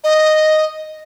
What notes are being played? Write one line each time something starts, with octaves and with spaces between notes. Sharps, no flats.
D#5